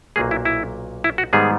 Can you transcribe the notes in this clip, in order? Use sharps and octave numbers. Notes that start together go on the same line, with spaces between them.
B1 A#2 F#3 A#3 G#4
E4
E4
E4
F#4
G#2 D#3 G3 B3 G#4